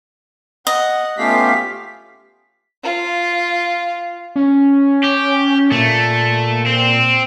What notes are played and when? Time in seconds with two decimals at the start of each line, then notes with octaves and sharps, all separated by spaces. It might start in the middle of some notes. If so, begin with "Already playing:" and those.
0.67 D#5 F#5
1.18 A3 B3 C#4 F4 G4 F5 B6
2.84 F4
4.36 C#4
5.04 G4
5.72 A#2 A3
6.67 C4